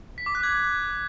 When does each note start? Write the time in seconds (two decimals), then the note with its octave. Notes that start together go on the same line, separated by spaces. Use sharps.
0.18 B6
0.26 D6
0.35 F#6
0.43 G#6
0.52 F#6